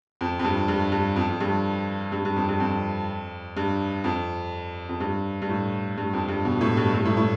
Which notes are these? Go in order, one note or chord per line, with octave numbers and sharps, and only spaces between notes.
F2
F2
G2
G2
G2
F2
F2
G2
G2
G2
F2
G2
F2
G2
F2
F2
G2
G2
A2
G2
F2
G2
B2
A2
G2
G2
A2
A2